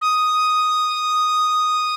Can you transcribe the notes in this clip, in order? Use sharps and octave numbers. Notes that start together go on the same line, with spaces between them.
D#6